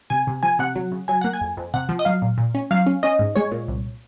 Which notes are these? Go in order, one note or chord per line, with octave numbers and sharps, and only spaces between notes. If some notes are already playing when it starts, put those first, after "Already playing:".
C3 G#5
C3
F3 G#5
C3 F#5
F#3
C#3
F#3 G#5
A#3 F#5
G#5
F2
F2
C3 F#5
F3
D#5
F#3 F5
A#2
A#2
C#4
F#3 F5
C#4
C#4 D#5
G#2
G#3 C#5
A#2
C2